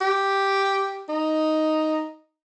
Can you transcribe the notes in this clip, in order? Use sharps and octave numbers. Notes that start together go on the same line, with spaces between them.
G4
D#4